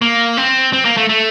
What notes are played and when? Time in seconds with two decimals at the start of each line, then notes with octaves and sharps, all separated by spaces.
0.02 A#3
0.37 C4
0.73 C4
0.85 A#3
0.97 A3
1.09 A3